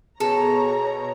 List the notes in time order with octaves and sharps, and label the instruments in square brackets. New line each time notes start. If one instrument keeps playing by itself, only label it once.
[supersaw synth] B2 [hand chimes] G#4 [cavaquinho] A4 [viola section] C#5 A#5